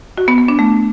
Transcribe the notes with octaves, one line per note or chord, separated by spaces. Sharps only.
F#4
B3
B3
D4
A3